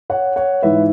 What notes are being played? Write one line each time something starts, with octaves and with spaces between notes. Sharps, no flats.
C#5 F#5
C#5 F#5
G#2 E3 B4 E5